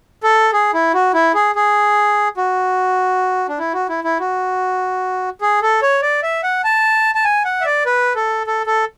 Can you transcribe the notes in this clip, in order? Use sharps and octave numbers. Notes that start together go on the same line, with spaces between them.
A4
G#4
E4
F#4
E4
G#4
G#4
F#4
D4
E4
F#4
E4
E4
F#4
G#4
A4
C#5
D5
E5
F#5
A5
A5
G#5
F#5
E5
D5
B4
A4
A4
A4